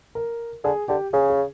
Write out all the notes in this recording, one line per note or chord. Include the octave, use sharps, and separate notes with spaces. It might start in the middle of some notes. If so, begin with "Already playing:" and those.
A#4
D3 G#4
D3 G4
C#3 G#4
G#4